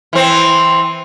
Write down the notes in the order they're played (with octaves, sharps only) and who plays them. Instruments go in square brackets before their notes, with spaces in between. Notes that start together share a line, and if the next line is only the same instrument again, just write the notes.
[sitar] E3 C4